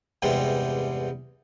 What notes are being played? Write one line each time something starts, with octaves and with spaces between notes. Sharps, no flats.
E2 G2 C3 G3 G#3